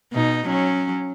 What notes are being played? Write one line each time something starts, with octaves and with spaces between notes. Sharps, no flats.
B2 D#4
F#3 C#4